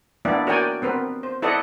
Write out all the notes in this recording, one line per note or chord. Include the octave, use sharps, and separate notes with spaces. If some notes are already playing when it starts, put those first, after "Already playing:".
A#3 B3 D4 E4 D5 E5
F#4 A#4 C#5 D5 G5 G#5
B3 C4 A#4 B4
C5
E4 A4 B4 D5 D#5 F#5